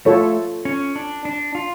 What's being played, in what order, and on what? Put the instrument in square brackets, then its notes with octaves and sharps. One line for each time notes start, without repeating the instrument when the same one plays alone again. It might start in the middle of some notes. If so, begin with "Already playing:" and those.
[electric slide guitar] A3 [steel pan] F4 A4 C#5
[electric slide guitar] C#4
D4
D4
F4